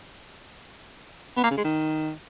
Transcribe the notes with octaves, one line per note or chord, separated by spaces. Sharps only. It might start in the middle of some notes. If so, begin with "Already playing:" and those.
B3
A#3
C#3
G#3
D#3